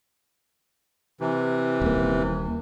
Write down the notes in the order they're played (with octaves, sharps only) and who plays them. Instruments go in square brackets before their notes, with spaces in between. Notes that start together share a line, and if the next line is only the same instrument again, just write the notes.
[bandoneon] C3 E3
[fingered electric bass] D#1 A#3